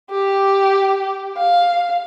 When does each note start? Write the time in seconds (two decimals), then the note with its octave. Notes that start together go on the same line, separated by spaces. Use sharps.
0.11 G4
1.37 F5